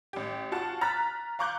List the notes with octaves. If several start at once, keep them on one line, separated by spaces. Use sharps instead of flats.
A1 G4
F4 F#4 A5
A#5 F6 F#6 A6 B6
F5 A#5 C#6 D6 F#6 G6